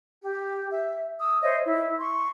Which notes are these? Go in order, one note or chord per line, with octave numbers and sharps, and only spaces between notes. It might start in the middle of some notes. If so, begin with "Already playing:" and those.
G4
E5
D#6 E6
C5 C#5 D#5 E5
E4
C6 C#6